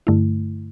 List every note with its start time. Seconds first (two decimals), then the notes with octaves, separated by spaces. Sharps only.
0.07 G2 D3 A3 E4